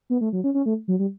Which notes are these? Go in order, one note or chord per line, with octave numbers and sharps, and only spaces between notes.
B3
A3
F#3
C#4
C#4
A3
F#3
G3